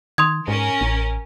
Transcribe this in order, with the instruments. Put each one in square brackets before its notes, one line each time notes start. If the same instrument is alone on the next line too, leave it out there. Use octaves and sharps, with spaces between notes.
[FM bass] D#3 [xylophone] C6 D#6 G#6
[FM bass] G#2 [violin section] C#4 A#4
[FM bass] A1